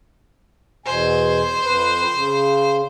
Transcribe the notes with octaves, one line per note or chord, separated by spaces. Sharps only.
E2 B2 C5 G#5
F2 B4
C#3